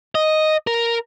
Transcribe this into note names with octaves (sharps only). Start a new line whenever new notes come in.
D#5
A#4